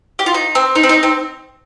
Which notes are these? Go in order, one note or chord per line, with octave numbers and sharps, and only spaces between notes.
G4
F4
D#4
C4
D#4
C4
D#4
C4